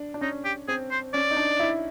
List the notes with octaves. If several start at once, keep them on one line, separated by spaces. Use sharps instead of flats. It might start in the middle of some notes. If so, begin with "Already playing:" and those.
Already playing: D4
D4
C#4 D#4
G4
C4 G#4
C5
C#4 D5
D#4
D4
E4